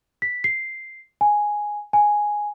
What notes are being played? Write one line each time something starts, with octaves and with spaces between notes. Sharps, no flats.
B6
C7
G#5
G#5